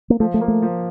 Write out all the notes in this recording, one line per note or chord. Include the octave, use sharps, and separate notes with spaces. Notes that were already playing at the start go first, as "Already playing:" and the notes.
A#3
F3 A3
A3
A#3
A3
F3